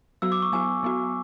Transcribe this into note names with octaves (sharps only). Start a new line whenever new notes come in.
F#3 B3 F#4 E6
D6
C#6
F#3 B3 F#4 G#5
F#3 B3 F#4